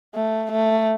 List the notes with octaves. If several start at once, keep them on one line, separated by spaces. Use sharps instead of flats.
A3
A3